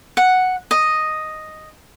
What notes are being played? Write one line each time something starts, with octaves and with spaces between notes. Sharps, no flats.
F#5
D#5